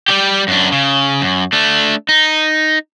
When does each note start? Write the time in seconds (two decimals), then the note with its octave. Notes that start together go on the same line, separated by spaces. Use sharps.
0.08 G3 G4
0.48 F#2 D4
0.72 C#3
1.21 F#2
1.53 A3 D4
2.09 D#4